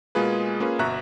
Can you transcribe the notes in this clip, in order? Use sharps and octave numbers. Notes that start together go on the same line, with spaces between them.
B2 G#3 A#3 F4 G#4 B4
A#3 C#4 F4 G#4 B4
G1 B2 E5 A#5 C#6 F#6